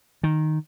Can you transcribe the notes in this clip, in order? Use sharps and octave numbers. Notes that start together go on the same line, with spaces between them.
D#3